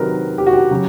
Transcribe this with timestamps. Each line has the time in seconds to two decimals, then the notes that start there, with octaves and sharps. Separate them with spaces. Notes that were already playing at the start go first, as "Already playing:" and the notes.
Already playing: C3 D#3 F#3 A#4 B4
0.38 G4
0.47 F#4
0.53 G4
0.71 C#3 F#3